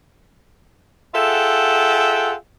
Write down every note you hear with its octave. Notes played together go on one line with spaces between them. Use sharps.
F4 G#4 A4 E5 F#5 G5